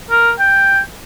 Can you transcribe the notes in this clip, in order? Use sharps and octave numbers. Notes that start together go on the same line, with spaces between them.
A#4
G5